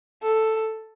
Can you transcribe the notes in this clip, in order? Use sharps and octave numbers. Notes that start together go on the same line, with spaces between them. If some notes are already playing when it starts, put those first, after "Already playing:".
A4